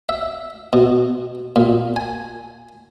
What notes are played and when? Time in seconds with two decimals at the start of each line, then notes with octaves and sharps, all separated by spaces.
0.09 E5
0.73 B2
1.56 A#2
1.96 G#5